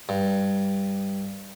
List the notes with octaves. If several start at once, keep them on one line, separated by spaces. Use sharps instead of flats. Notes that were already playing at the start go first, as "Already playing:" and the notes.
G2